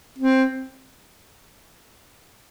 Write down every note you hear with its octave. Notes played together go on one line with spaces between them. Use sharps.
C4